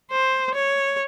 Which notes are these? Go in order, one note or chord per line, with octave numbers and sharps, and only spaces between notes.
C5
C#5